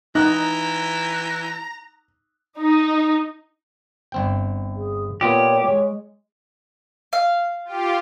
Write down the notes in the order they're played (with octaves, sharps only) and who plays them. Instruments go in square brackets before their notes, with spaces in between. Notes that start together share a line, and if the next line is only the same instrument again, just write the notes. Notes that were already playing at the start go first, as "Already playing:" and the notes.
[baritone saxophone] E3 [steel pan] D#4 [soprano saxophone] A#5 [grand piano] F#6
[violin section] D#4
[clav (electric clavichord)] G1 C4 G5
[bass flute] G#4
[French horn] A#2 [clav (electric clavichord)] B3 F4 D#5 [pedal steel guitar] G4 [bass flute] C#5
[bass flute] G#3 [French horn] C#5
[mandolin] F5
[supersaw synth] F4 G4